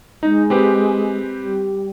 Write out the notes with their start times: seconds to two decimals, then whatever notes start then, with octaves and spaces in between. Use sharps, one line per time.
0.23 G#3 D#4
0.50 C4 G4 B4
1.36 G3